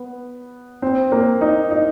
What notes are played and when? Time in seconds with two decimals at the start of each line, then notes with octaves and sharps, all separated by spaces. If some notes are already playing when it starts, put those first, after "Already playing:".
Already playing: B3
0.82 C4
1.12 A#3
1.41 D#4
1.71 D#4